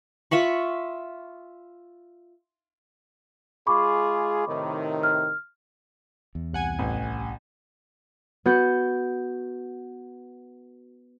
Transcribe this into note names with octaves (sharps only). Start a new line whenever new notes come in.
F4 E5 B5 C#6
G#3 F4 G#4 B5 C#6 D6
A2 C3 D#3
F6
E2
C2 F#5 G#5
A1
B3 F#4 F#5 G6 C#7